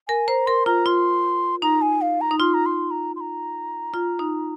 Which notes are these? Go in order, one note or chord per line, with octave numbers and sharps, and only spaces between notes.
A#4 G#5
C5 A#5
A#4 C6
F4 A#5
F4 C6
D#4 A#5
G#5
F5
A#5
D#4
F4 C6
A#5
C6
A#5
C6
A#5
F4
D#4